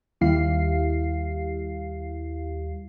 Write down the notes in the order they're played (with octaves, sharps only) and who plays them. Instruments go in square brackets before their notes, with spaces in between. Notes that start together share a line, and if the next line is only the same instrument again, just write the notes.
[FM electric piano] D#2 G3 E4 G4 F5 C7